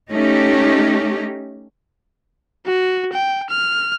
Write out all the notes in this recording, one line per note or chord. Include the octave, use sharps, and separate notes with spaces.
A3 C#4 D#4 G4
F#4
G5
F6